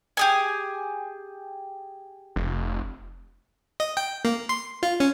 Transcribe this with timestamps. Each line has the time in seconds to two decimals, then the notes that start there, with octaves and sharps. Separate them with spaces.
0.17 G4 G#4 G#5
2.36 F1
3.80 D#5
3.97 G5
4.25 A#3
4.49 C6
4.83 F4
5.00 C#4